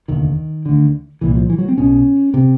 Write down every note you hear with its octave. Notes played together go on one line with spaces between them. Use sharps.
F1 D#2 D3 D#3
D2 D3
C2 A#2 E3
F3
E3
F#3
C4
B1 B2 C#4
C3